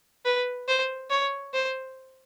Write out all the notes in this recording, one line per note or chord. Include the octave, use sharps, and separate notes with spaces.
B4
C5
C#5
C5